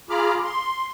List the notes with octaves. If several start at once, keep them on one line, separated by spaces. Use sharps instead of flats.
F4 G#4 A#5 B5 D6 F6
C6